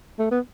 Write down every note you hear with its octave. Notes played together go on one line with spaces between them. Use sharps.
A3
B3